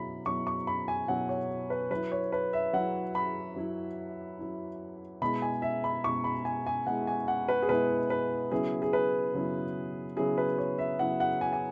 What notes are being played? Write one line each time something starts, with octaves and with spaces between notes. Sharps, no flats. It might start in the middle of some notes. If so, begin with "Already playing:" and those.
Already playing: B2 F#3 E4 B5
B2 F#3 E4 C#6
C#6
B5
G#5
B2 F#3 E4 F#5
C#5
B4
F#3 E4 B4
C#5
B4
E5
F#3 E4 F#5
B5
F#3 E4
F#3 E4
B2 G#3 E4 B5
G#5
E5
B5
B2 G#3 E4 C#6
B5
G#5
G#5
B2 G#3 E4 F#5
G#5
F#5
B4
G#4
B2 G#3 E4 B4
B4
C#3 F#3 B3 E4 G#4
G#4
B4
C#3 F#3 B3 E4
C#3 F#3 B3 E4 G#4
B4
C#5
E5
C#3 F#3 B3 E4 F#5
F#5
G#5
G#5